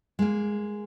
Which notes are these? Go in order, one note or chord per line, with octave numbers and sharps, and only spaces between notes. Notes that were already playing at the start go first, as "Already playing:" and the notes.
G#3 A#3